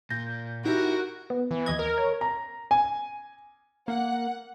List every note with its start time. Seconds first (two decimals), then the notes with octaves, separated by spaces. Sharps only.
0.10 A#2 G6 A#6
0.65 D#4 E4 F#4 G4 A#4
1.30 B3
1.51 E3
1.66 D#2 D#5 G#6
1.79 A#4
1.98 C#5
2.21 A#5
2.71 G#5
3.88 A#3 F#5